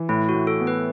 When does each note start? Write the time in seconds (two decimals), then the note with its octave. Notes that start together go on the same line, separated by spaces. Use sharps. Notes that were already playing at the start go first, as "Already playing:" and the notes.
Already playing: E3
0.09 A2 E4
0.29 F#4
0.34 A2
0.47 A4
0.61 B3
0.67 B4